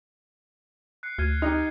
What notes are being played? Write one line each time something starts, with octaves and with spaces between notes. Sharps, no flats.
F#6 C7 C#7
D2 F6 G#6 D#7
D#4 G4